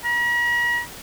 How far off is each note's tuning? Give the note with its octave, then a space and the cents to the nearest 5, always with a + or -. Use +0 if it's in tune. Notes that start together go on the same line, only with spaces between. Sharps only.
A#5 +45